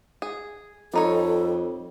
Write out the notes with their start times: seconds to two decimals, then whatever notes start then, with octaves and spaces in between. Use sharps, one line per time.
0.22 G#4
0.93 F2 G3 D#4 A4 C#5